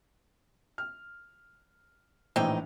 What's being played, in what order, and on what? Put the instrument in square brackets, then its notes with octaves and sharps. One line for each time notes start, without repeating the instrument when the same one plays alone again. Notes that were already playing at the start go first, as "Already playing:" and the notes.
[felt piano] F6
[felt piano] A#1 A2 E3 [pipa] C4 D#4 G5